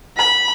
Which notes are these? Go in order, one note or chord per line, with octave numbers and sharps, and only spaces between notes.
B5